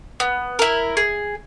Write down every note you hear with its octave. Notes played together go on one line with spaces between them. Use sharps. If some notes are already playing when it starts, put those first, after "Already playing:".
B3
E4 A#4
G#4